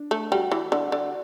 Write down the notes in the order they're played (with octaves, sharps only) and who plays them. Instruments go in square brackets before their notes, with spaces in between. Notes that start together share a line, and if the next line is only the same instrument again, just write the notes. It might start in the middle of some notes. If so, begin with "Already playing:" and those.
Already playing: [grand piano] D4
[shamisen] A3
[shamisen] G3 [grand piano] F#4
[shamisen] E3
D3
D3